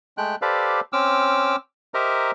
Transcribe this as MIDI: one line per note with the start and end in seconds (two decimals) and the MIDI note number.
0.18 0.35 56
0.18 0.35 57
0.18 0.35 79
0.18 0.35 90
0.42 0.80 67
0.42 0.80 69
0.42 0.80 71
0.42 0.80 72
0.42 0.80 74
0.42 0.80 77
0.93 1.56 60
0.93 1.56 61
0.93 1.56 86
0.93 1.56 88
0.93 1.56 89
1.94 2.31 67
1.94 2.31 70
1.94 2.31 72
1.94 2.31 75
1.94 2.31 76
1.94 2.31 82